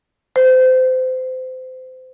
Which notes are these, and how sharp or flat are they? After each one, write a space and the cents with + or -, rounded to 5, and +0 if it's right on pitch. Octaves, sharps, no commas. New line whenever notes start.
C5 -25